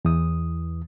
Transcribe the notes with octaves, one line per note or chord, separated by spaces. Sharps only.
E2 E3 D#6